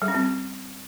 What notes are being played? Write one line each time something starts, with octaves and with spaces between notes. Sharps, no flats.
G3
C#4
C4